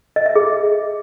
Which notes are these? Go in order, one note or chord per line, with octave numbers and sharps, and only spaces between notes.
D#5
E5
G#4